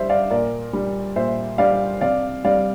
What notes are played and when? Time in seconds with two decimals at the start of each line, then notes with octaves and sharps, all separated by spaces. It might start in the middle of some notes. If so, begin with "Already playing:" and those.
Already playing: G3 C5 E5
0.10 D5 F5
0.31 A#2 A#4 D5
0.73 G3
1.16 A#2 C5 E5
1.58 G3 D5 F5
2.01 C3 D5 F5
2.45 G3 D5 F5